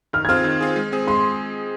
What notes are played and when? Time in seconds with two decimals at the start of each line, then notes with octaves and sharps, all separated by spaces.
0.13 D#3 F6
0.25 G#6
0.29 C4 F4 G#4 F6
0.44 D#3
0.61 C4 F4 G#4
0.76 G#3
0.92 C4 G#4
1.07 G#3 C6